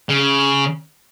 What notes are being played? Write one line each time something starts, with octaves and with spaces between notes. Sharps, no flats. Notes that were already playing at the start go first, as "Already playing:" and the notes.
C#3